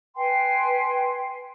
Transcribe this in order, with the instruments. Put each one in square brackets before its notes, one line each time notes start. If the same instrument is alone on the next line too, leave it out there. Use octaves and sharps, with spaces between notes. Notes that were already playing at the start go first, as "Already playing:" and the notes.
[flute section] B4 G5 G#5 C6